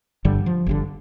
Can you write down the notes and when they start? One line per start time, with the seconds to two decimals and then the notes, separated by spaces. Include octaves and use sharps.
0.25 G1 G2 D3 G3
0.46 F3
0.66 G1 G2 D3